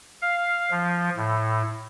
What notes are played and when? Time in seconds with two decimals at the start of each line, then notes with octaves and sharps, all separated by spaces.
0.22 F5
0.71 F3
1.16 A2